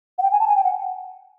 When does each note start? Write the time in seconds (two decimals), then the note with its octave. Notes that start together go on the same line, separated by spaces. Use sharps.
0.18 F#5
0.22 G5
0.32 G#5
0.40 A5
0.48 G#5
0.56 G5
0.64 F#5